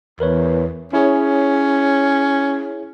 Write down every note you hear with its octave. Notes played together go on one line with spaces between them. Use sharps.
E2 A#4 B4 C#5
C#4 E4 G#4 C#5